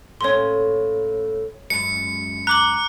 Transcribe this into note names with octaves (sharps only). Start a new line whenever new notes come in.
A2 A#3 C#4 C#5 C6
F#2 G#3 C#7
A#5 D6 F#6 F#7